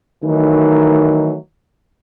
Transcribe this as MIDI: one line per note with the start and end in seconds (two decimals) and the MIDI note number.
0.24 1.37 51
0.24 1.37 52
0.24 1.37 54
0.24 1.37 57
0.24 1.37 63